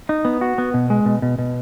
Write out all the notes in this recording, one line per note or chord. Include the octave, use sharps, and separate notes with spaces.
D#4
B3
F#4
B3
B2
G#3
B2
B2
B2